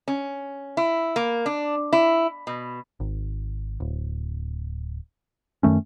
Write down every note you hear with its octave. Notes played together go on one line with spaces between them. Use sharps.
C#4
E4
A#3
D4
E4
B2
G#1
D1
F#2 D#3 A3 C#4